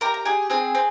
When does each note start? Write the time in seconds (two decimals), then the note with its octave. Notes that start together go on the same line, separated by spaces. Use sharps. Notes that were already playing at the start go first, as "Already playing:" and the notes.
0.01 G4 A#4 A#5
0.14 A#5
0.25 G4 G#4 G#5
0.50 C4 G#4 G#5
0.75 C4